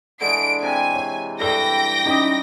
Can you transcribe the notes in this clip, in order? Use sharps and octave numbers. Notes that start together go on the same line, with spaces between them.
D3 E3 G#3 D7
C3 G#5
C#5
G2 E3 A4 G5 A#6 G7
C#4 D#4 G4 D#5